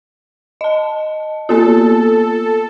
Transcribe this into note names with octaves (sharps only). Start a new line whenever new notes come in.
D#5 A5
A#3 B3 F4 A4